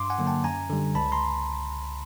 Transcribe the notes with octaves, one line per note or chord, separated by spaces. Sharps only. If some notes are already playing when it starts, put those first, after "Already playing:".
Already playing: G2 C6 D6
F#5 G#5
D3 F#3 A#3
G5 A5
F#2 G#5 A#5
D3 G3
C#2 A5 B5
A#5 C6